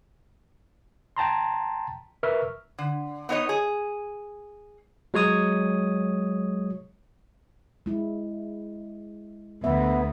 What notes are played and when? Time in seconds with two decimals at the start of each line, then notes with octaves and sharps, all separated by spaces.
1.17 G5 A5 A#5 C6
2.23 A#4 B4 E5 C#6 F6
2.78 D3
3.29 B3 D#4 C#5 D#5
3.49 G#4
5.14 F#3 G#3 C#5 D#6
7.86 G#3 E4
9.64 D2 B3 E5